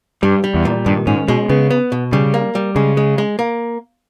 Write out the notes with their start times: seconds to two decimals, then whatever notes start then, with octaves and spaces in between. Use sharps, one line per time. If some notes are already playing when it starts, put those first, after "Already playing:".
0.23 G2 G3
0.44 G3
0.54 E2
0.65 A#2
0.86 G2 D#3
1.07 G#2 C#4
1.28 B2 G#3
1.49 C#3 B3
1.71 B3
1.92 B2
2.13 C#3 G3
2.34 A#3
2.55 G3
2.76 C#3 G#3
2.97 G#3
3.18 G#3
3.39 A#3